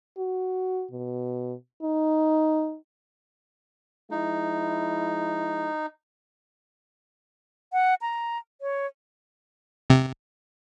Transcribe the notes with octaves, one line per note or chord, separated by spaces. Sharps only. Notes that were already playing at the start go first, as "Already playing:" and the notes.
F#4
B2
D#4
F3 G#3 D#4 E4
F#5
A#5
C#5
C3